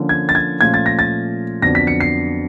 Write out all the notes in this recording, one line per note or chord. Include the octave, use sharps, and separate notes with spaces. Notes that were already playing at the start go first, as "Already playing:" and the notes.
Already playing: D3 F3 A#3 C#4 F4
G#6
A6
G#6
A#2 F3 A3 C#4 F4 G#6
A6
A#6
A6
F2 D3 F#3 B3 D4 A#6
B6
C#7
C7